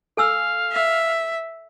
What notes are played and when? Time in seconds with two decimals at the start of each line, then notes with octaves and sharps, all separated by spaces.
0.17 A4 F5 G#5 E6
0.72 E5